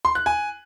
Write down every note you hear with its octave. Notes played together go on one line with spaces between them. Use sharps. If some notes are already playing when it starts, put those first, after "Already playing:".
C6
F#6
G#5